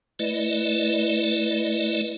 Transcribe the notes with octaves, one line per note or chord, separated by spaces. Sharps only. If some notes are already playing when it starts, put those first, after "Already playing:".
A3 E4 B4 D5 D#5